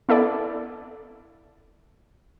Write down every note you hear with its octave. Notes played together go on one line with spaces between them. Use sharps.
B3 E4 A4 D5